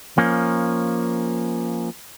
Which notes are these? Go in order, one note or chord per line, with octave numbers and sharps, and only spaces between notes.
F3 A#3 C#4